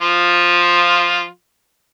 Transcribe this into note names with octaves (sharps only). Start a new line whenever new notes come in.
F3 F4